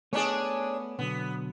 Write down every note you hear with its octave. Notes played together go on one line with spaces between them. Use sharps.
A3 B3 C#4 D4 G#4
B2 D3 F#3 B3